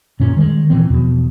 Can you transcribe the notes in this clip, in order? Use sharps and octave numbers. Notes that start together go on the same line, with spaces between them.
F#2 A#2 C#4
D#3 G3 G#3
A#2 E3 C4
E2 B2 F3